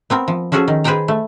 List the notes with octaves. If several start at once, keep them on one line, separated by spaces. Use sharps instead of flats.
B3 C4 A#4
F3
F3 C#4 F#4 G#4 A4
D#3
G#4 B4 C5 F5 G5 A#5
A3